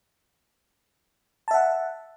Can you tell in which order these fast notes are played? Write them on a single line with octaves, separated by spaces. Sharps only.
A5 E5 F#5